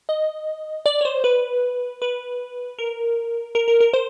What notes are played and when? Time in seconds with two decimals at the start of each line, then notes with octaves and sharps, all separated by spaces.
0.09 D#5
0.86 D5
1.01 C#5
1.05 C5
1.24 B4
2.02 B4
2.79 A#4
3.55 A#4
3.68 A#4
3.81 A#4
3.93 C5